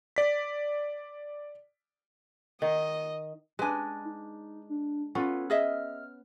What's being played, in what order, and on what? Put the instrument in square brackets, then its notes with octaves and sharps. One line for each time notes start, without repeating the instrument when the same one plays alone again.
[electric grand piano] D5 B6
[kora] D#3 [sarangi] D#5
[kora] G#3 D4 [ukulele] B4 G#5
[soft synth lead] D#4
D4
[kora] B3 C#4 [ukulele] F4 [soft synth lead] A4
[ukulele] G#4 D#5 E5 [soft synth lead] F6